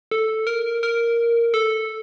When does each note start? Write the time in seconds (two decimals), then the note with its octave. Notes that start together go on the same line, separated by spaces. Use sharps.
0.11 A4
0.47 A#4
0.83 A#4
1.54 A4